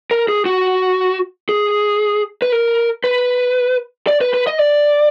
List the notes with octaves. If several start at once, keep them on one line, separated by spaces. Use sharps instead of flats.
A#4
G#4
F#4
G#4
B4
A#4
B4
D5
B4
B4
D#5
D5